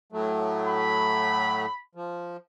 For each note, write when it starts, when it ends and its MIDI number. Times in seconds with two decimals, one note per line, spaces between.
0.12 1.66 45
0.12 1.66 54
0.12 1.66 57
0.67 1.82 83
1.95 2.37 53